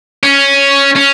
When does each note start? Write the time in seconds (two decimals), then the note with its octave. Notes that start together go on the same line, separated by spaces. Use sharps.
0.23 C#4
0.96 C#4